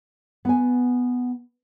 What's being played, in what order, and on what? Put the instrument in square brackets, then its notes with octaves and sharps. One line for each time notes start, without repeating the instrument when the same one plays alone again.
[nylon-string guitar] B3 G#5